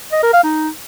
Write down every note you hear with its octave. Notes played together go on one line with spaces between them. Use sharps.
D#5
A#4
F5
D#4